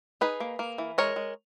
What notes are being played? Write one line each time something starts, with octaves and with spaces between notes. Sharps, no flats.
D#4 G#4 B4
A#3
A#3
E3
G#3 A#4 C#5
G#3